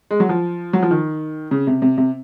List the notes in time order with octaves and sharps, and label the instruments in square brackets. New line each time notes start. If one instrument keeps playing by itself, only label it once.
[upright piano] G#3
F#3
F3
F#3
F3
D#3
C#3
C3
C3
C3